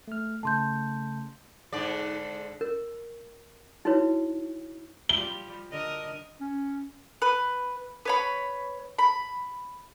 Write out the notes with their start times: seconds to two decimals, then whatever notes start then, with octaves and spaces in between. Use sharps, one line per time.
0.08 A3 F6
0.43 C#3 A3 A5 C6 G6
1.73 G#2 D3 D5
2.61 A#4
3.85 D#4 E4 F#4 B4 C#5
5.09 F3 G3 G7
5.70 D3 A#4 D#5
6.40 C#4
7.22 B4
8.05 B4 C#5 B5
8.99 B5